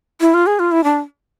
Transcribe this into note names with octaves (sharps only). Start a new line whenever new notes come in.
E4
F4
G#4
F4
E4
D4